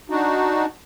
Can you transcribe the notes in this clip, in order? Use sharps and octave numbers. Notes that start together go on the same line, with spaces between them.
D4 D#4 F#4